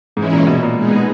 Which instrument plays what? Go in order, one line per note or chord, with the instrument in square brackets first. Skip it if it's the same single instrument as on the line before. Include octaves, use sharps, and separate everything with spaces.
[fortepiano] G#2 [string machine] E3 G#3 C#4 E4
[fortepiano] A#2
B2
A#2
[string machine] G#3 B3 D#4 G#4